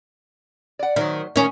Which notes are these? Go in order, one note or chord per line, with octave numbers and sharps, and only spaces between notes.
D5 F#5
D#3 F#3 C5 E5
D#3 C#4 E5 G#5